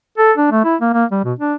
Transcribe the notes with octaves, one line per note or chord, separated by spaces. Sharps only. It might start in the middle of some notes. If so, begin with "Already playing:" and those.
A4
D4
A3
E4
A#3
A#3
G3
B2
D4